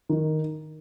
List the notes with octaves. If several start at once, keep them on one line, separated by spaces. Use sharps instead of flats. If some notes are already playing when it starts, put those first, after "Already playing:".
D#3